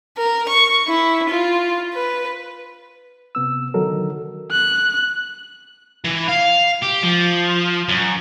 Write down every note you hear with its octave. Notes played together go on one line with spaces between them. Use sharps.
A#4
C#6
E4
F4
B4
C3 B3 E6
D3 D#3 F#3 D#4 A4 A#4
F#6
E3
F5
G4
F3
F#2